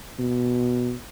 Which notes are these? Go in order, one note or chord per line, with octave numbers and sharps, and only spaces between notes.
B2